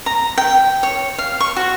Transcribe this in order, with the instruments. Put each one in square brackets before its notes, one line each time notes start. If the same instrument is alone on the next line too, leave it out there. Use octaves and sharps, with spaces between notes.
[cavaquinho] A#5
G5
C#5
F5
C#6
F#4